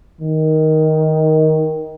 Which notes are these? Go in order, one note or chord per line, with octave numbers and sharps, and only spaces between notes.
D#3